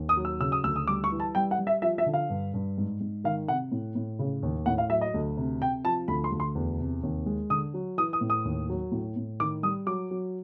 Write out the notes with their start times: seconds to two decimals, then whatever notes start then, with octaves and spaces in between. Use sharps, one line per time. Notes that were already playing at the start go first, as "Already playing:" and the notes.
Already playing: D#2
0.09 D#6
0.17 F#3
0.25 E6
0.40 C#3 E6
0.52 D#6
0.64 D2 E6
0.76 D#6
0.87 G3 D6
1.04 C#6
1.11 E3
1.20 A5
1.35 G3 G5
1.51 F#5
1.59 G3
1.67 E5
1.82 F3 E5
1.98 E5
2.06 D3
2.14 F5
2.30 G2
2.54 G2
2.78 G#2
3.00 G#2
3.24 D#3 F5
3.48 C3 F#5
3.72 A2
3.95 A2
4.19 C#3
4.43 D#2
4.66 A2 F#5
4.78 F5
4.90 F#3 E5
5.01 D#5
5.14 D2
5.37 C3
5.61 C3 G5
5.85 F3 A5
6.08 D2 B5
6.24 C6
6.32 D2
6.40 C6
6.55 E2
6.80 C3
7.03 D#2
7.26 G#3
7.50 D3 D#6
7.74 F#3
7.98 E3 D#6
8.13 D#6
8.21 A2
8.30 D#6
8.45 D#2
8.69 F#3
8.92 A2
9.16 A2
9.40 D#3 D6
9.63 G3 D#6
9.86 F#3 D6
10.11 F#3